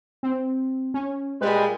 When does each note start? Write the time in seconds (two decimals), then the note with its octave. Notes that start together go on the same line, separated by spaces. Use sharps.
0.23 C4
0.94 C#4
1.41 A#2 G3 G#3 B4 B5